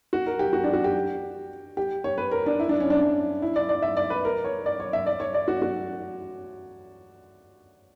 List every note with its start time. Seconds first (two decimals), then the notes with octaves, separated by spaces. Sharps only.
0.13 F#4
0.27 A#4
0.39 G4
0.53 F#4
0.64 D4
0.73 F#4
0.84 G4
1.77 G4
2.04 C#5
2.18 B4
2.31 A#4
2.46 D4
2.60 E4
2.69 D4
2.81 C#4
2.90 D4
3.01 D4
3.42 E4
3.56 D5
3.69 D5
3.82 E5
3.97 D5
4.10 B4
4.25 A#4
4.45 C#5
4.66 D5
4.80 C#5
4.93 E5
5.07 D5
5.20 C#5
5.34 D5
5.48 F#4
5.62 F#4